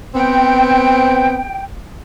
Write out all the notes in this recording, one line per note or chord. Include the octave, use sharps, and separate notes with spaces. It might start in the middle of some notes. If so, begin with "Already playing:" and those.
B3 C4 G5